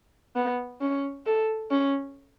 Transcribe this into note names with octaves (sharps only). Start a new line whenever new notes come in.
B3
C#4
A4
C#4